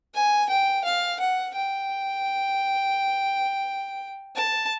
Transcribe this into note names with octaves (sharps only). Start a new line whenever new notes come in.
G#5
G5
F5
F#5
G5
A5